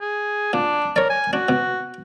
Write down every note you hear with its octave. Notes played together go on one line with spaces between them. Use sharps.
G#4
A#2 D4
A#4 C#5 D5
G#5
D4 F#4
B2